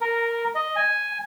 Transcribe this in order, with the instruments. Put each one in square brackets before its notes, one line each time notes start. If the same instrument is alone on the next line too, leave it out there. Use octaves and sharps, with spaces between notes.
[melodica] A#4
D#5
G#5